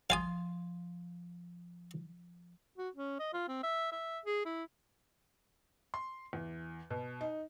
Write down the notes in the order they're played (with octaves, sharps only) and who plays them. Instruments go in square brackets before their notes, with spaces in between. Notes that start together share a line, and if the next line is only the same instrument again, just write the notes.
[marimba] F3 C6 A6 [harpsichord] F5 G#5 D#6
[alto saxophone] F#4
C#4
D#5
F4
C4
E5
E5
G#4
E4
[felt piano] C6
E2
B2
D#4